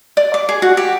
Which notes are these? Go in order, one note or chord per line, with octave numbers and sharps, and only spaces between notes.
D5
D6
G#4
F#4
G4